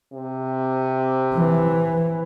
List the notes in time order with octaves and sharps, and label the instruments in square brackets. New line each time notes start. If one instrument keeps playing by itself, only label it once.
[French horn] C3
[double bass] E3